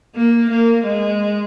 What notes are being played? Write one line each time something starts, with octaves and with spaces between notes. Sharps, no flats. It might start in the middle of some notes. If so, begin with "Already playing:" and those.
A#3
A#3
G#3